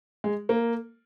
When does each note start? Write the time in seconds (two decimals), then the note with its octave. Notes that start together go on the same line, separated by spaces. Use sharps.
0.24 G#3
0.49 A#3